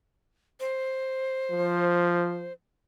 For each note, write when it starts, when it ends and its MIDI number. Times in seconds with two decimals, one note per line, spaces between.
0.60 2.52 72
1.52 2.50 53